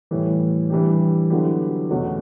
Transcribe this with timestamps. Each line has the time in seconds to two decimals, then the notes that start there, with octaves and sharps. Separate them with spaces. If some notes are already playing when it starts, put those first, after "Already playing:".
0.11 A2 E3 G3
0.70 E3 G3 D4 G4
1.30 D3 F#3 B3 E4 G4
1.90 E2 B2 A3 C#4 F#4